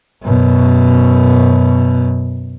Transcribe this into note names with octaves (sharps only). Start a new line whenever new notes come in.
F#2 B2